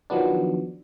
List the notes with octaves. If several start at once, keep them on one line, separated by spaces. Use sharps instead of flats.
D#3 F3 F#3 B3 D4